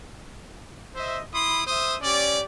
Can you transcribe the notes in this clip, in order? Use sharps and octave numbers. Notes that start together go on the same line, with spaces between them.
C5 D#5 E5
E4 B5 C6 D#6
C5 E5 D#6
C#4 G4 D5